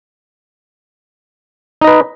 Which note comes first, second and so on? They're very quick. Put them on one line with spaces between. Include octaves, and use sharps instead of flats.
D#4 D#5 B4